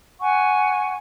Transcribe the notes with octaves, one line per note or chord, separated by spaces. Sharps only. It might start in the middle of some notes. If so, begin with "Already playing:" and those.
F#5 G#5 C#6